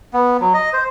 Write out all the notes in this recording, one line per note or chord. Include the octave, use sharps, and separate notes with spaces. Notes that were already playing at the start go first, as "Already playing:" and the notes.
B3
F#3
D#5
C5